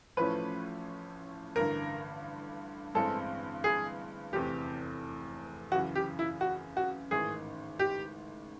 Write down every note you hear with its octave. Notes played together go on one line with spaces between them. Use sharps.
A1 A2 F3 A3 C#4 B4
A1 G2 D3 A#4
A1 G2 E3 G#3 C4 A4
G#4
F1 E2 C3 G4
F#2 C#3 E3 F#4
G4
E4
F#4
F#4
A1 G#2 D#3 G#4
G4